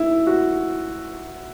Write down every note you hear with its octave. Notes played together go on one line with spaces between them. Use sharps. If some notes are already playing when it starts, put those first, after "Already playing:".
Already playing: E4
F#4